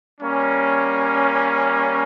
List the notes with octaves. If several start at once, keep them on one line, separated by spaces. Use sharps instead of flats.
G3 A#3 C#4